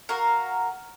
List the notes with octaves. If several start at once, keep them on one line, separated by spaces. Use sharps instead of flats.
F#4 A#4 F5